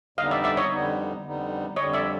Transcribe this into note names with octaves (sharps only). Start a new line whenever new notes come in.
F2 D3 G3 B3 D#4 D#5 F5
D5 E5
D5 E5
C#5 D#5
F2 D3 G3 B3 D#4
F2 D3 G3 B3 D#4
F2 D3 G3 C#5 D#5
D5 E5